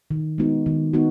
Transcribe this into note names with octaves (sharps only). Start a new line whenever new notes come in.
D#3
G#3 B3 D#4 F#4
D#3
B3 D#4 F#4